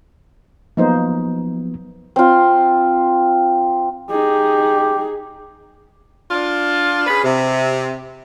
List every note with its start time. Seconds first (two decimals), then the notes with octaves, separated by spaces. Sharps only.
0.77 F3 F#3 A#3 B3 D#4 C5
2.16 C4 F4
4.10 D#4 G4 G#4
6.31 D4 F4
7.07 C#4 G#4 B4
7.24 C3